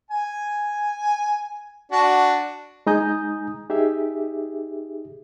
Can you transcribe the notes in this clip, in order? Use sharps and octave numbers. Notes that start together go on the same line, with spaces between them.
G#5
D4 F#4
G#3 D#4 G#5 A#5 D#6 G6
D#4 G4 G#4 E5